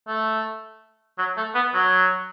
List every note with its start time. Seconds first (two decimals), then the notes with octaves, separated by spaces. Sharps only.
0.08 A3
1.18 F#3
1.37 A3
1.55 B3
1.74 F#3